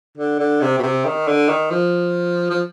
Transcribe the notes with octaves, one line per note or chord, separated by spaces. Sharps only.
D3
D3
C3
B2
C3
D#3
D3
D#3
F3
F3